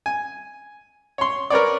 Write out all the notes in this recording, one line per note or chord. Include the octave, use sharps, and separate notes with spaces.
G#5
C#5 C6
A#4 B4 C#5 D5